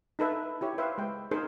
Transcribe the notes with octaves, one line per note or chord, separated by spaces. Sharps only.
D#4 A4 B4 E5
E4 G4 C#5
B4 C5 E5 F5
G#3 G5
D#4 G#4 A#4 C5